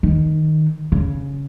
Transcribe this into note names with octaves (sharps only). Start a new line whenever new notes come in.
D#3
C#3